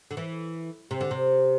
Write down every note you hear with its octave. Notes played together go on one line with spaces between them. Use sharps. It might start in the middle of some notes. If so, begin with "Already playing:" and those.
D3
E3
C3
D3
C3